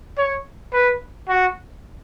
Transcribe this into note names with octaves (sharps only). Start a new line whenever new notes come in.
C#5
B4
F#4